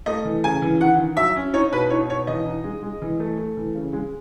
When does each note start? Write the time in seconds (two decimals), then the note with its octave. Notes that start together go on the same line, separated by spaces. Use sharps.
0.06 A3 D#5
0.25 E3
0.44 C#3 G#5
0.62 E3
0.80 D#3 F#5
0.98 D#3
1.17 F#3 E5
1.36 C#4
1.53 D#4 C#5
1.72 B2 B4
1.90 D#4 C#5
2.09 B2 C#5
2.27 E3 D#5
2.45 D#4
2.64 G#3
2.83 G#3
3.02 E3
3.20 A3
3.38 A3
3.57 E3
3.75 C#3
3.93 G#3